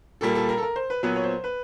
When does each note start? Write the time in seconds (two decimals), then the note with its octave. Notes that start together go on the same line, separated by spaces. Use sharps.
0.21 A#2 G3 A#3 A4
0.35 A4
0.49 A#4
0.57 A4
0.63 A#4
0.76 C5
0.90 B4
1.03 A#2 F#3 B3 B4
1.16 C#5
1.24 C5
1.44 B4